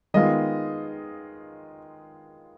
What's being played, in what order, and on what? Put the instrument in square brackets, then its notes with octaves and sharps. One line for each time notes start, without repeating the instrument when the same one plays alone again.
[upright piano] D#3 G#3 B3 F4 D#5